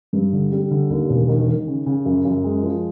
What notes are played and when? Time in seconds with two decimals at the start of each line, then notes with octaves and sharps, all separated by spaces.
0.13 G2
0.32 D3
0.52 G3
0.71 D3
0.90 D#2
1.09 E1
1.28 D#3
1.48 D#3
1.67 C#3
1.86 C#3
2.05 F#2
2.25 F#2
2.44 G#3
2.63 F3